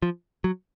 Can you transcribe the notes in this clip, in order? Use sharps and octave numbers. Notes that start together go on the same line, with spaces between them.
F3
F#3